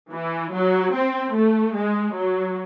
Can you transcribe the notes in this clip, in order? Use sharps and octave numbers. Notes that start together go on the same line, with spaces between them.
E3
F#3
C4
A3
G#3
F#3